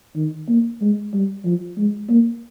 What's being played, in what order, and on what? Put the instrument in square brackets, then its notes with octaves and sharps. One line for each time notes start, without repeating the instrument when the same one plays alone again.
[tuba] D#3
A#3
G#3
G3
F3
G#3
A#3